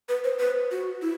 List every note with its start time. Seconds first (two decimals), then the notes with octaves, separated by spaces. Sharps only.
0.09 B4
0.24 C5
0.40 B4
0.71 F#4
1.02 E4